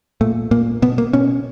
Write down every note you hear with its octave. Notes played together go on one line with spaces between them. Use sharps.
A#2 A3
A#2 A#3
B2 B3
A#3
B2 C#4